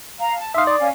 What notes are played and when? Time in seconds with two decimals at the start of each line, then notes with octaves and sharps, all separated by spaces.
0.19 F5 A#5
0.37 A5
0.54 D#4 E5 F5 C6 D#6
0.67 D5
0.79 C#4 F5 G#5